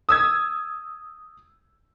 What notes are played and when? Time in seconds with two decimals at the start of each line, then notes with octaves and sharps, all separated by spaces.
0.09 D#6 E6 G#6